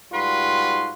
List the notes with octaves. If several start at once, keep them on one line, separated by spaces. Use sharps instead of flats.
G#2 G3 F4 F#4 B4 C6